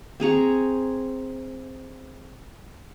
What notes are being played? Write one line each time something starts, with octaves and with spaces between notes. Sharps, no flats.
C4 G#4 A#5 C#6